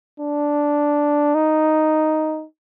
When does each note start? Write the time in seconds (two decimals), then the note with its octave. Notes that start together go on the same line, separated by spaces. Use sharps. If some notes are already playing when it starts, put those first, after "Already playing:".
0.20 D4
1.35 D#4